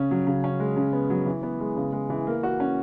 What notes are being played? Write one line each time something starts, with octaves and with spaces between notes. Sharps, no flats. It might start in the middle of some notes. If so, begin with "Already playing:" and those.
Already playing: C#3 C#4
F#3
C#3
C#4
G#3
C#3
B3
F#3
E3
B3
G#3
C#3
G#3
E3
A#3
F#4
C#4